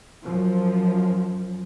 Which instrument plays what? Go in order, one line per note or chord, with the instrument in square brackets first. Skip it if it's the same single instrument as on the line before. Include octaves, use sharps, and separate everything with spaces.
[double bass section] F#2 F3